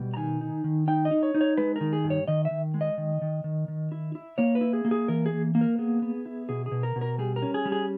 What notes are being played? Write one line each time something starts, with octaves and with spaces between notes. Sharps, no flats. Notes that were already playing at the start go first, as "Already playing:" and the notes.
Already playing: B2 G3
A#5
D#3 G#5
D#4
D#3
D#4 G5
D#5
D#4
C#5
D#4
C#5
G#3 B4
D#3 A#4
G#4
G2
C#5
D#3 D#5
E5
D#3
G#3
D#5
D#3
D#3
D#3
D#3
E4
E4
A#3 C#5
B4
E4
G#4
A#3
G#4
E3 A#4
G#4
A#3
A#3
A#4
B3 G#4
B3
E4
B2 G#4
G#4
B2
A#4
B2
A#4
G3 G#4
A#4
C#4
G#4
G3
G#4